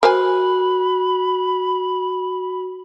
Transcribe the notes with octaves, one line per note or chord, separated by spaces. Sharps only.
F#4 A#4 C5 G#5 B5